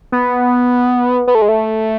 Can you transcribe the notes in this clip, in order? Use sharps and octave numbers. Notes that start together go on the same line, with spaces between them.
B3
B3
A3
G#3
A3